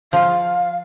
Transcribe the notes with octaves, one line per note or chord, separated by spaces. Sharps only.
F3 F5